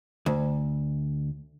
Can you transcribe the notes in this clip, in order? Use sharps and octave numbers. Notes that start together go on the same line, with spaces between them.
D2